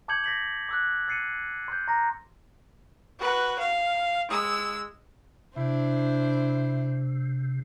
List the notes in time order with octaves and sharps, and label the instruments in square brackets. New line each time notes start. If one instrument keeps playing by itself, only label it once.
[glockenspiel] A5 D6 G6 G#6 C#7 F#7
A#6 B6 F#7
D6 E6 F#6
E6 A6 C7 C#7 D#7
C6 G6
A#5 C6 D6 A#6
[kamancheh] F#4 B4
F5
G#3 E6
[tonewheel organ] C3 [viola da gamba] D4 C5 [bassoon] E4